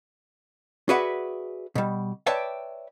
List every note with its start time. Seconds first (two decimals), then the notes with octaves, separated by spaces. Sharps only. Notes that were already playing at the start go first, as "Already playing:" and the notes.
0.89 F#4 G#4 B4 D5 E5 F#5
1.75 B2 G3
2.26 B4 C#5 D5 E5 G5 A5